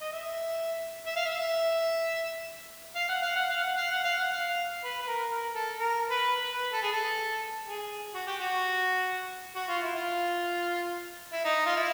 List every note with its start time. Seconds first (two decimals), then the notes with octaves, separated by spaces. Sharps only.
0.01 D#5
0.12 E5
1.06 E5
1.16 F5
1.25 E5
2.95 F5
3.09 F#5
3.22 F5
3.36 F#5
3.50 F5
3.64 F#5
3.77 F5
3.91 F#5
4.04 F5
4.17 F#5
4.32 F5
4.84 B4
5.02 B4
5.07 A#4
5.31 A#4
5.55 A4
5.78 A#4
6.10 B4
6.41 B4
6.72 A4
6.83 G#4
6.92 A4
7.67 G#4
8.14 F#4
8.27 G4
8.40 F#4
9.55 F#4
9.69 F4
9.82 E4
9.95 F4
11.33 E4
11.44 D#4
11.66 F4
11.76 E4